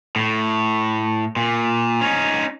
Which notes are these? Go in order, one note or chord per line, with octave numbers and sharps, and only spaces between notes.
A2
A#2
C#4 D#4